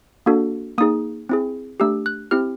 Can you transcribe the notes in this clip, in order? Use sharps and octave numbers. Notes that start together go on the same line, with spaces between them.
A#3 D4 F#4 A4
A#3 D#4 G#4 D#6
C4 E4 G#4
A3 D4 G4 E6
F#6
C4 E4 G4 F6